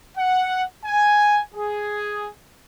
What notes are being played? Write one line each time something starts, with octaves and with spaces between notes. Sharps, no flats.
F#5
G#5
G#4